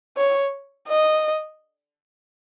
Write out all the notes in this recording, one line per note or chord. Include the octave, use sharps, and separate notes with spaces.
C#5
D#5